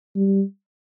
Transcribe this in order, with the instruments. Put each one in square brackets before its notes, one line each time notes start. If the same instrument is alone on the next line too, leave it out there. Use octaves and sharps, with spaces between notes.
[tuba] G3